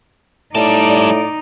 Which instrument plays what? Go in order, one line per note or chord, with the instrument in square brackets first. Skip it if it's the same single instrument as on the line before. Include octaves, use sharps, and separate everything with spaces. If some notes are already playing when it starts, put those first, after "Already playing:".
[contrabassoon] A2 [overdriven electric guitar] G3 A5 [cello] D#4 [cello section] D5